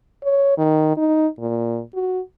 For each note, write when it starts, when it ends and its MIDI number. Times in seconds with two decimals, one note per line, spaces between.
0.24 0.57 73
0.58 0.94 51
0.97 1.27 63
1.40 1.81 46
1.94 2.20 66